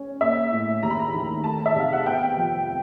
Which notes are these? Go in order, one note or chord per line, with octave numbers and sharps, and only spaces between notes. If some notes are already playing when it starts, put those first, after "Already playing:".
Already playing: C#4
A#3 E5
A2
D#2 A#5
B5
A#5
D#3
A3 A5
E5
C3 F5
F#5
B3 G5
F2
G3